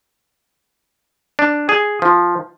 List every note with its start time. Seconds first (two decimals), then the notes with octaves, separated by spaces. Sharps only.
1.39 D4
1.69 G#4
2.02 F3